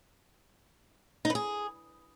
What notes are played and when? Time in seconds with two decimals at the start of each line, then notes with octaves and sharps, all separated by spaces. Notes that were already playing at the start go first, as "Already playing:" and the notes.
1.25 D#4
1.30 B4
1.35 G#4